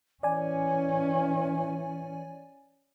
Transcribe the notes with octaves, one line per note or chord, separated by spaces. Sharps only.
E3 C#4 D5 G#5